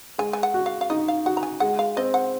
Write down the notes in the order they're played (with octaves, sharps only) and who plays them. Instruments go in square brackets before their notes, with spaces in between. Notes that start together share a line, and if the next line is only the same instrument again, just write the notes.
[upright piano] G#3 [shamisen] G#5
[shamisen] G#5
F#5
[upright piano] F#4
[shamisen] F5
F5
[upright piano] D#4 [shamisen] D#5
[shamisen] F5
[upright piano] F#4 [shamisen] F#5
[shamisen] A#5
G#5
[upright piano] G#3 [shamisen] F#5
[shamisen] F5
[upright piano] C4 [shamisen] D#5
[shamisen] F#5